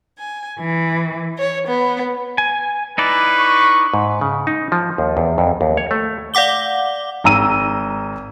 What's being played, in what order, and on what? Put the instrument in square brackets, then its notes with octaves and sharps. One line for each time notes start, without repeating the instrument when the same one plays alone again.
[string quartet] G#5
E3
C#5
B3
[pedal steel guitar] G#5
[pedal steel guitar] D#4 E4 D5 [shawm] B4
[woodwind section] C#6
[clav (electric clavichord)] G#2
C#3
D#4
F3
D#2
E2
F2
D#2
C#5
A3
[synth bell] D5 F5 F#5 D6 G7
[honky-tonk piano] G#1 A#5 E6 D#7